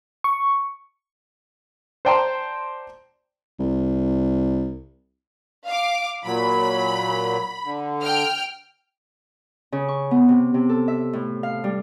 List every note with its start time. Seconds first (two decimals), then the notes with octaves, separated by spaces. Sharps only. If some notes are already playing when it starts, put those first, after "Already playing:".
0.24 C#6
2.05 C5 D5 G5 A5 A#5 C6
3.60 C2
5.67 F5 D6
6.25 A#2 F#3 B5
7.65 D3
8.02 G5 F6
9.72 C#3
9.88 C#6
10.11 B3
10.29 C3
10.54 C3
10.69 A4
10.88 E5
11.13 A2
11.43 F5
11.64 G3